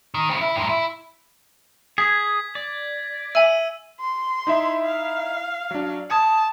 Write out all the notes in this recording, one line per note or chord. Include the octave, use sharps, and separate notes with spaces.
D#3
C#3 C4
E4
G2 A#2
E4
G#4 G#6 B6
D5
E5 G#5 E6 D#7 F#7
C6
D#4 E4 E5
F5
F#3 D4
A5 D#6 G#6 C#7